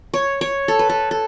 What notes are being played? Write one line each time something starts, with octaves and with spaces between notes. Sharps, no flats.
C#5
C#5
A4
B4
A4
A4